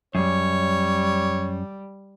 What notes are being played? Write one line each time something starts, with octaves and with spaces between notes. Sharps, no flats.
F#2 G3 C#5